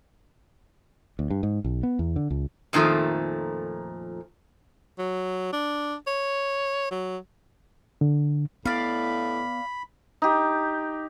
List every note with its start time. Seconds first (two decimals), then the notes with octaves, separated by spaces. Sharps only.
1.19 D2
1.30 G2
1.43 G#2
1.64 B1
1.83 B3
1.99 E2
2.16 D3
2.31 C#2
2.73 F2 A#2 D#3 F3 A3
4.99 F#3
5.53 D4
6.07 C#5
6.91 F#3
8.01 D3
8.65 A2 B3 D5 F5 B5
10.22 D#4 G4